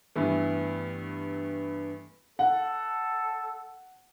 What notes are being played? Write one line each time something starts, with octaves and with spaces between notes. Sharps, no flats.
G2 E3 A3 B3
A4 F#5